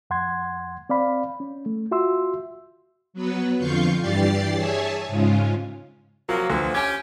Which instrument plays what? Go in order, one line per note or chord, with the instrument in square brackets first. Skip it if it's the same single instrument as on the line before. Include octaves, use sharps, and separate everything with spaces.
[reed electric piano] F2 F#5 C6 G#6
C4 D5 F5 B5
C#4
A3
F4 F#4 E5 C6 E6
[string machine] F#3 B3 B4
F2 D3 F4 F5 C#6 G6
G2 E3 G4 D5 A6 C7
G#4 C#5 E5 G#5 A5
G#2 C#3 G#3 C#4 F4
[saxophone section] C3 F3 A#3 [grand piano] F#3
[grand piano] D2 [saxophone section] D3 E3 F3
[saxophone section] C#4 G4 [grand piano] G#5 G#6